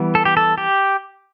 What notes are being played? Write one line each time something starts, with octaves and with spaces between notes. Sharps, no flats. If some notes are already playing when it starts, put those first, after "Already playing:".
Already playing: E3 G3 B3
A4
G4
A4
G4